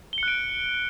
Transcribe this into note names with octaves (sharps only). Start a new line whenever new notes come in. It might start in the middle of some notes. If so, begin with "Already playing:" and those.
F#6 C#7 D7 G7